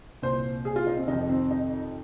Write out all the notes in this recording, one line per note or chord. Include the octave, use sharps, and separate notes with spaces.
C2 A#2 C5
G#4
F4
D#4
C4
F2 C3 D#3 D#4
C4
D#4